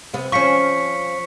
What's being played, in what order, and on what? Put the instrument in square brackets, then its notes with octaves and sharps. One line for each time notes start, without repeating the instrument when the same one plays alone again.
[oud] C3 B3
[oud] F3 C#4 [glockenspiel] C#6 B6 C#7